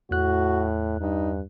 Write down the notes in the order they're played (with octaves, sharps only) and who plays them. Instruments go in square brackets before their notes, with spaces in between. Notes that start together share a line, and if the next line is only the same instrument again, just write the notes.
[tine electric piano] E2 F#6 [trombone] A2 [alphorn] F#4
[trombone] G2 [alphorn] D#4